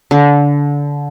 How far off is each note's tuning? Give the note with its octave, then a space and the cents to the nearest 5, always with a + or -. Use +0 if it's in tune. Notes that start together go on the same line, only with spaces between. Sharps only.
D3 -25